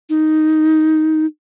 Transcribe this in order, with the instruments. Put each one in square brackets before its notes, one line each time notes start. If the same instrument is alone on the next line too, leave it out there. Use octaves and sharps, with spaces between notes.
[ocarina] D#4